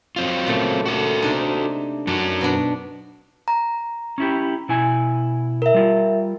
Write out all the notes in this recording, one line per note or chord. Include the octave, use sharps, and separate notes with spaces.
F#3 C4 F4
A#2 C#3 A3
F#4 A4
C3 D4 D#4
F#2 F#3 D4 D#4
B2 B3 D4
A#5
C#4 E4 G4
B2 E4 G#5
A#4 E5
G3 F4